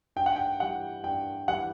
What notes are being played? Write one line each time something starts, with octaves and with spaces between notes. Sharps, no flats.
G2 G5
F#5
G5
E3 G3 F#5
G2 G5
E3 G3 F#5